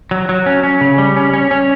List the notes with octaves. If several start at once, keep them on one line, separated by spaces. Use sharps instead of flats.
F#3
F#3
C#4
C#4
C#3
G3
C#4
C#4
C#4